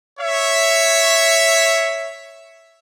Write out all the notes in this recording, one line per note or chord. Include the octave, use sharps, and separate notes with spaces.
C#5 E5